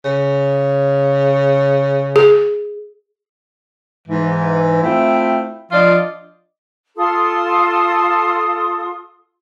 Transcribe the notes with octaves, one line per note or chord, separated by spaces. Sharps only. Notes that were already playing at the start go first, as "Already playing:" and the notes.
C#3
G#4
G#2 E3
A3 C4 E4 F4 G5
F3 D4 F4 D5 D#5
F4 A4 C6 D#6